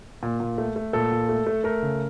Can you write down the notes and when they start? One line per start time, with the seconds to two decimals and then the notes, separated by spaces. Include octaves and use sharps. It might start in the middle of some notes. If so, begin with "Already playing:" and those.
0.23 A#2
0.40 A#2
0.58 A3
0.76 A3
0.93 A#2 A4
1.12 A#2
1.29 A3
1.47 A3
1.64 A3 A#4
1.82 C#3